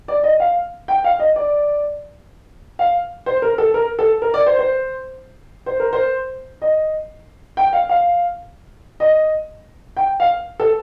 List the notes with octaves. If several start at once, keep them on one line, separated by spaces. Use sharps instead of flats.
D5
D#5
F5
G5
F5
D#5
D5
F5
C5
A#4
A4
A#4
A4
A#4
D5
C5
C5
C5
A#4
C5
D#5
G5
F5
F5
D#5
G5
F5
A4